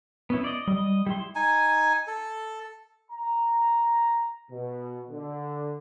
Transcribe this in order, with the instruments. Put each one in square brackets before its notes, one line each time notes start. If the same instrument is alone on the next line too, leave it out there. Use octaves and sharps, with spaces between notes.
[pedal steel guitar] B3 C#4 E4
D5 D#5
[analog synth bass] G3 [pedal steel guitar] D#5
[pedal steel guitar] G3 E4 C6
[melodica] D#4 G#5
A4
[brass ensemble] A#5
B2
D3